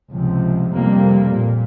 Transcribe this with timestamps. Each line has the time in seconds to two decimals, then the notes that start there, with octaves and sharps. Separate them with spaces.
0.13 C#2 C3 F3
0.73 F2 C3 G3 A#3
1.35 A#2